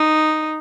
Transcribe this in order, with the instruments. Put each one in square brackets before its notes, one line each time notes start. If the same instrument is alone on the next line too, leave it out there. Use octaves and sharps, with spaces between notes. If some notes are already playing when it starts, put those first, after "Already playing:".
Already playing: [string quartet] D#4